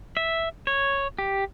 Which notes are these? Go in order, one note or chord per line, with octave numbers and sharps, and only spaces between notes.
E5
C#5
G4